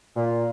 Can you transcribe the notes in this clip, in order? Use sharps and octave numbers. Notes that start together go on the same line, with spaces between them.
A#2